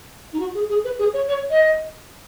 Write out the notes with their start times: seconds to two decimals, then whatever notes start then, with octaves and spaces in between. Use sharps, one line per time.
0.33 D#4
0.40 F#4
0.55 G#4
0.69 G#4
0.84 B4
0.99 G#4
1.13 C#5
1.29 C#5
1.51 D#5